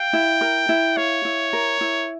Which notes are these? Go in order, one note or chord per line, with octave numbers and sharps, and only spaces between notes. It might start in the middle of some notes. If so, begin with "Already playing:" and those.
Already playing: F5 G5
E4
A#4
E4
C#5 F5
E4
A#4
E4